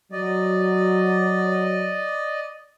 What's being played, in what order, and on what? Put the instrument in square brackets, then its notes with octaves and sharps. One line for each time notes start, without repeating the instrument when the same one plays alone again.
[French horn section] F#3 [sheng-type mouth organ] D5 D#5